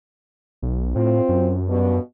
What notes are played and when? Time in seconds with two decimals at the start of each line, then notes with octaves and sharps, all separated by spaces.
0.62 B1
0.96 A2 C4 F4
1.29 F#2
1.68 G2 B2